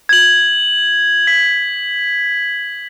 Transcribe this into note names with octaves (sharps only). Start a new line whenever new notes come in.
G#6 F#7
B6